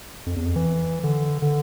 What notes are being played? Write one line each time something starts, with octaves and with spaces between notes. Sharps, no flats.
F2
E2
F2
E3
D3
D3